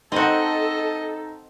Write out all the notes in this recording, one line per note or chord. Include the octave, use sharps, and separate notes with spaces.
C4 D#4 F#4 A4 D#5